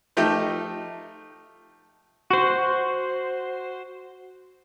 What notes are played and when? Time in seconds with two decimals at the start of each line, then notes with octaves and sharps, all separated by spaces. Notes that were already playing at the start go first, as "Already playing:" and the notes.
0.17 F3 A3 D#4 G4
2.30 F#4 C5